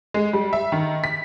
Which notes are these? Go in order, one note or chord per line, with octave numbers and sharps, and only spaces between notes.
G#3
G3
E5
D#3
B6